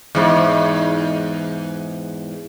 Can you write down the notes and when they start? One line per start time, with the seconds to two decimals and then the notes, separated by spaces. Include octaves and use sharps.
0.15 E2 G#2